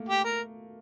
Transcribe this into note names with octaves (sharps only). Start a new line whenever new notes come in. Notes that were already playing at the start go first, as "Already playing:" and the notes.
Already playing: A3 A#3
G4
A#4